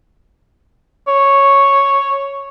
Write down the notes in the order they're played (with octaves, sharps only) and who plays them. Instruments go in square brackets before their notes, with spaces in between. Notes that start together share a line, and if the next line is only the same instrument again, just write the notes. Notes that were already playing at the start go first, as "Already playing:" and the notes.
[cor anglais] C#5